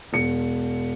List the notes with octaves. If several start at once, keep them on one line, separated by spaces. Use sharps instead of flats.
E1 C#7